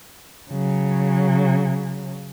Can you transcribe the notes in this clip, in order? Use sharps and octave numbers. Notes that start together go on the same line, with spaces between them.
C#3 F#3